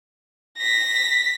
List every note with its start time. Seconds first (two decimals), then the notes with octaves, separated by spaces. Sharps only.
0.58 A#6 B6